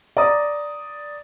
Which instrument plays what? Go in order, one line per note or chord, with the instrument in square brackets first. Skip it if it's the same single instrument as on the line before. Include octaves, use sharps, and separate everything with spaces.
[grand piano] D5 A#5 D#6